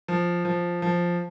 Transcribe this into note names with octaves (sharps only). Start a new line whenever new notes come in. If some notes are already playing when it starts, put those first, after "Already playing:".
F3
F3
F3